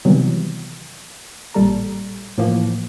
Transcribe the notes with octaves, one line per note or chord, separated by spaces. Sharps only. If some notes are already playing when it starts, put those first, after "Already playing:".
C3 D#3 E3 F#3 G3 B3
A1 A#2 G3 A4 A#5
A2 E3 F3 A#3